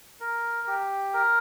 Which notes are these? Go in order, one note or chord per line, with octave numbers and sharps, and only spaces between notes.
A#4
G4
A#4